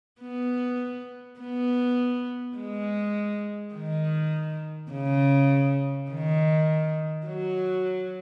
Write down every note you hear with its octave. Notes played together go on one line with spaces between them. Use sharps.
B3
B3
G#3
D#3
C#3
D#3
F#3